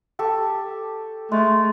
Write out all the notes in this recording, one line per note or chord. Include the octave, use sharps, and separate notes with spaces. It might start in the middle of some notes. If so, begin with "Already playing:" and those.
G4 A4 C#6
G#3 A3